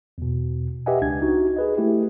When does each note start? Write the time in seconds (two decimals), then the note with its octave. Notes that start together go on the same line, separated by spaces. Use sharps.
0.18 E2 B2
0.86 G4 B4 D#5 E5 F#5 G#5
1.02 C#2 D4 G#6
1.22 D#4 F#4
1.56 G#4 B4 D#5
1.77 A3 E4 G4